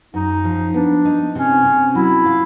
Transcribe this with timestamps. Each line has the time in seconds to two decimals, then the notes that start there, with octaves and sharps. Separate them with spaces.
0.14 F#2 D#4
0.44 F3
0.74 B3 D4
1.05 D#4
1.35 C3 C#4
1.65 C3
1.95 F#3 E4
2.25 F4